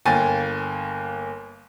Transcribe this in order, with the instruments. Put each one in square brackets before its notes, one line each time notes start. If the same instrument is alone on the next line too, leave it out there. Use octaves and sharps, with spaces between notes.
[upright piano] G1 A#3 G5 G#5 A6